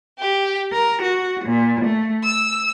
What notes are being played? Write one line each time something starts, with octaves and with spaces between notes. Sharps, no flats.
G4
A#4
F#4
A#2
A3
E6